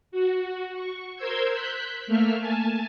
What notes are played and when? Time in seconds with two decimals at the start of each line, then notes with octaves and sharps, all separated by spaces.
0.12 F#4
0.73 C#6
1.16 A#4 C5 C6 E6 G6 G#6
1.52 F#6 G6 B6
2.07 A3 A#3 E5 F6
2.40 G#5 A5